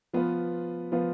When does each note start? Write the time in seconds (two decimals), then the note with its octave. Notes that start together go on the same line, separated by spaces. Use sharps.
0.13 F3 B3 F4 B4
0.92 F3 B3 F4 B4